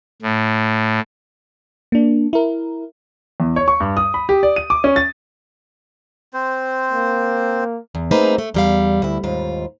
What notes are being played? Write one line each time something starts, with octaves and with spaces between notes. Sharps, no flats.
A2
A#3 D4
E4 A#4
E2
C#5
C#6
G2
D#6
B5
G4
D5
D#7
D6
C#4
A6
C4 C5
A#3
E2
A3 A#3 C4 D#4 G#4 B4
A3
E2 G3 F5
D2 E4
D#2 G#2 F4